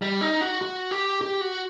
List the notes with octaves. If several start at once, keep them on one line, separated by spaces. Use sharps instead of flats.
G3
D#4
F#4
F#4
G4
G4
F#4